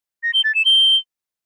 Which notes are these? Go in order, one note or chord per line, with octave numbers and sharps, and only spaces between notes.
A#6
G7
A6
E7
G7